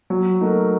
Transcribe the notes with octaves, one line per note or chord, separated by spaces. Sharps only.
F#3
A3 D#4 F#4 A#4